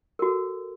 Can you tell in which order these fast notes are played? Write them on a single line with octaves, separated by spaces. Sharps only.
A#4 F#4 A4